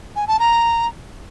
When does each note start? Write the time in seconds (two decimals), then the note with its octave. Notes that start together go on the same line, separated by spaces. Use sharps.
0.16 G#5
0.28 A5
0.39 A#5